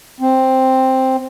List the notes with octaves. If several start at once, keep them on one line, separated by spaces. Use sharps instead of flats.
C4